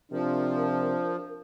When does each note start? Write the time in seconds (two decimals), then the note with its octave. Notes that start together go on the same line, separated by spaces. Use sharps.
0.12 C3 F3 D4 A#4